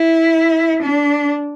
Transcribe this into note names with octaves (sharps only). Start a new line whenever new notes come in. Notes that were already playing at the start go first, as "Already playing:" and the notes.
Already playing: E4
D4